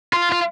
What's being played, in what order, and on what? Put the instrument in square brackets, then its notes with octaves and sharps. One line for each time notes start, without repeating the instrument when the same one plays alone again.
[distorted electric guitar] F4
F4